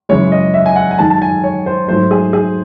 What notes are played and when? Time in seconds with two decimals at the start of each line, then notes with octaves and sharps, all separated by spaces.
0.09 F#2 C#3 E3 G#3 C#5
0.32 D#5
0.54 E5
0.66 G#5
0.76 F#5
0.91 G#5
0.99 F#2 D#3 G#3 A5
1.10 A5
1.22 G#5
1.44 C#5
1.66 C5
1.88 G#2 F#3 A3 C5
2.11 G#4
2.33 G#4